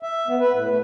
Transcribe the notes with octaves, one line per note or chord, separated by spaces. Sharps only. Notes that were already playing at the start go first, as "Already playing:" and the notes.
E5
B3
B4
A2
A3